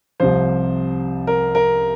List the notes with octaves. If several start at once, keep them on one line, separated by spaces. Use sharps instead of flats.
C2 C3 F3 C5
A#4
A#4